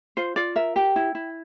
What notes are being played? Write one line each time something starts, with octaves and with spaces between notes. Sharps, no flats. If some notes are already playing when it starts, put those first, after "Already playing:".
F4 C5
F4 D5
A#4 E5
G4 G5
E4
E4